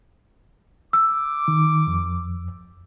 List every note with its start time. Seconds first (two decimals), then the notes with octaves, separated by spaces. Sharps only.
0.93 D6 E6
1.48 D#3
1.87 F2